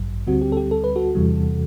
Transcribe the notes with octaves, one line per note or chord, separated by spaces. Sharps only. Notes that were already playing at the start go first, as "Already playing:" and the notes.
Already playing: A1 G2 F#3
D2 D3 G3 C4 F#4
G4
A4
G4
A4
B4
F#4 A4
E2 C3 E3 G3